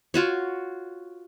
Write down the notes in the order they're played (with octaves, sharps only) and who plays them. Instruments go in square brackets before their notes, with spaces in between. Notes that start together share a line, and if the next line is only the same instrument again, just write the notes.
[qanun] F4 F#4 C#5